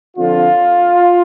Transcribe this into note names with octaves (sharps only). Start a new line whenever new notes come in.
F2 D3 F4